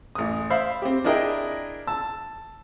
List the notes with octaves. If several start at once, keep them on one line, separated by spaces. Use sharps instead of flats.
A1 D#6
C5 E5 F5 B5
C4 G4
D4 E4 G#4 A#4 D#5 G5
A5 E6